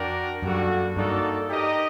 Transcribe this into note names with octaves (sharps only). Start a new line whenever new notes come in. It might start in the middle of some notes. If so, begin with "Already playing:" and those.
Already playing: F2 D4 F#4 A#4 D5 G5
F#2 G3 A#3 D4 F#4 A4
G2 A#3 D#4 F#4 A4 D5
D#4 G4 A#4 D#5